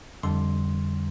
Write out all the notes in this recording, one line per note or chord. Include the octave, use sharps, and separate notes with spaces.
F2 D3 G3 C6